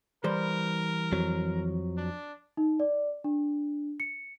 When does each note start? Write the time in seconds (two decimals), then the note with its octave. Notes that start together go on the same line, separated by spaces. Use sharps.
0.24 E3 G3 A#4 C5
1.13 F2 F#3
1.97 D4
2.57 D#4
2.80 D5
3.24 D4
4.00 C#7